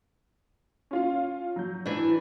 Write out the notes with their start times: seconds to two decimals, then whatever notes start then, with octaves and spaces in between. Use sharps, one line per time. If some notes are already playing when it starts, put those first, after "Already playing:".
0.91 C#4 F4 F5
1.56 F#3 G6
1.86 E3 D4